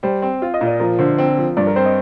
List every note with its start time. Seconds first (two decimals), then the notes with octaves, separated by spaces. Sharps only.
0.03 G3 C5
0.22 C4
0.42 F4
0.54 D#5
0.61 A#2
0.67 D5
0.80 F3 A#4
0.99 D3 C5
1.18 C4
1.38 F3
1.57 G2 D5
1.67 A#4
1.76 C4 C5
1.86 D#5